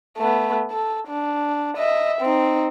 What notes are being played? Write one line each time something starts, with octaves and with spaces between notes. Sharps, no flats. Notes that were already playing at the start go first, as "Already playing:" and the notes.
A3 B3
A4
D4
D#5 E5
C4 D#4